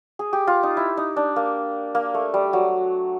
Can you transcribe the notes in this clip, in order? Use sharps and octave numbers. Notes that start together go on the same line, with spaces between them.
G#4
G4
F4
D#4
E4
D#4
D4
A#3
A#3
A3
G3
F#3